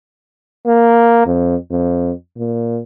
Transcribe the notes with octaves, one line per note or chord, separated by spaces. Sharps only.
A#3
F2
F2
A#2